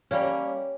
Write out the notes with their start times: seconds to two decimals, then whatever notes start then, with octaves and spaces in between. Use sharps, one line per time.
0.11 G3 A#3 C#4